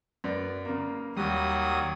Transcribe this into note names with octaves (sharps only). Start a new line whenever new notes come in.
F#2 B4 D5
C#3 A#3
D#2 F#3 G3 D#6